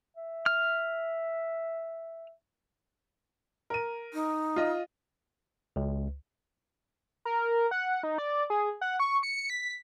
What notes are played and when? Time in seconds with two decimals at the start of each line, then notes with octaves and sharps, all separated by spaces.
0.17 E5
0.46 F6
3.70 A#4 D#7
4.13 D#4
4.56 F4 D#5
5.76 C#2
7.25 A#4
7.71 F#5
8.03 D#4
8.18 D5
8.50 G#4
8.81 F#5
9.00 C#6
9.23 C#7
9.50 B6